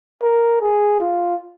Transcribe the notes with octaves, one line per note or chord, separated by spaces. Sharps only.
A#4
G#4
F4